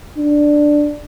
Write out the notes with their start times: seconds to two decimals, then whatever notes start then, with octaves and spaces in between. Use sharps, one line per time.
0.18 D4